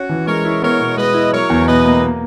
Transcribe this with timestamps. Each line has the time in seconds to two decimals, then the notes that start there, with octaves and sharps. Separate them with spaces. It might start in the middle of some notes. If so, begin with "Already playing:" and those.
Already playing: C#4 F#4
0.09 E3
0.27 G#3 A#4 C#5
0.45 E4
0.62 B3 A#4 C#5
0.79 B2
0.97 G#3 B4 D#5
1.14 E4
1.32 F#3 A#4 C#5
1.49 E2
1.67 B2 B4 D#5
1.85 A#3
2.02 A#3